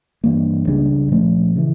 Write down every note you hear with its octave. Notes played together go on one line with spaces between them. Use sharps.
G2 E3 A#3
C#2 C#3 G3 D4
A#2 F3 A3 C#4
C#3 E3